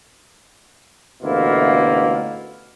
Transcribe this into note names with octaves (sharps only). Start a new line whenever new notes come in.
A1 D2 B2 A#3 E4 F4